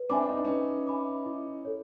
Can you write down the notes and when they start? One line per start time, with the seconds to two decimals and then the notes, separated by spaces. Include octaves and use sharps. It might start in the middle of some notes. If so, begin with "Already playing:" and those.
Already playing: B4
0.09 C4 D4 E5 G#5 B5 D6
0.29 D#4
0.37 D4
0.45 C#4 D#4 B4
0.87 E5 G#5 B5 D6
1.26 E4
1.65 A4 C#5